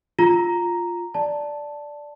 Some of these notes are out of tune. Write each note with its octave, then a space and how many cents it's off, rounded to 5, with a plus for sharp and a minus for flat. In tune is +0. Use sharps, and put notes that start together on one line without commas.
F4 +0 A#5 +0
D5 +0 A5 +0